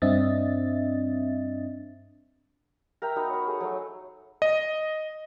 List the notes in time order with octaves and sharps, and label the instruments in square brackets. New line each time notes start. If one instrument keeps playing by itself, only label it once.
[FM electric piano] G2 C4 D4 D#5 E5 A6
[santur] A#4 E5 G5 A#5
B3 D#4 F#4 B4
A#4 C#5
A3 G#4
F#3 A3
[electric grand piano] D#5